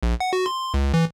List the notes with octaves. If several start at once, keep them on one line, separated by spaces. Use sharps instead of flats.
A#1
F#5
F#4
C6
C#2
E3